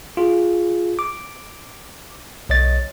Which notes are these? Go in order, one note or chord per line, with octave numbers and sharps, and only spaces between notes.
F4 G#4
D6
B1 C#5 D#5 A6